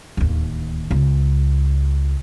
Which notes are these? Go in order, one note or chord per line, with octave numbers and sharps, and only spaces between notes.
D1 D#2
C#2